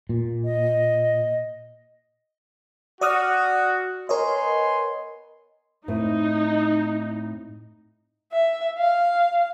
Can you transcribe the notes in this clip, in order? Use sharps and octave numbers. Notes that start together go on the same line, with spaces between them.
A#2
D#5
F#4 D5 D#6 F6
B3 A#4 C#5 D#5 G#5 C6
A2 C4 D#4
E5
F5